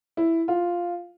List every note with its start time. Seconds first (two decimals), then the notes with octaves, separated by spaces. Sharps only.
0.17 E4
0.48 F4